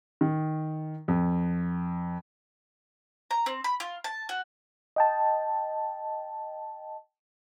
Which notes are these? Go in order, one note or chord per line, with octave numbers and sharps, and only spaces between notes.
D#3
F2
A#5
C4
B5
F4
A5
F#4
D#5 G5 A5